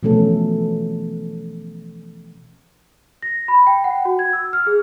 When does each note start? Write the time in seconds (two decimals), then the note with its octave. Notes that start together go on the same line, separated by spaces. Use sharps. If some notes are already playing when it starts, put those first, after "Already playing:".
0.03 B2 E3 F3 A3 C#4 A4
3.22 A#6
3.48 B5
3.67 G5
3.84 F#5
4.05 F#4
4.19 G#6
4.33 E6
4.53 F6
4.67 G#4